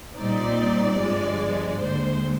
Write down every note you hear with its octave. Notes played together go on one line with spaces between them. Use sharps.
A#2 G3 C4 D#4 D5
G1 G2 F3 G#3
D#2 D3 G#3 C5